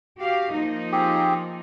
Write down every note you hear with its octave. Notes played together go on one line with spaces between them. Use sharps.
F#4 G4 F5
F3 A#3 D#4
C4 G4 G#4